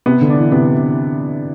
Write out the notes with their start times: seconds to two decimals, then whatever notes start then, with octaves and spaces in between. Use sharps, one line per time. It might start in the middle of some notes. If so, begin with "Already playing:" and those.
0.06 C3 B3
0.21 D3
0.30 D4
0.37 E3
0.52 C3 B3